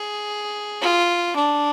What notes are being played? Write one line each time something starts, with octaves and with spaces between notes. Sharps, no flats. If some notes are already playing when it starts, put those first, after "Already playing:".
Already playing: G#4
F4
D4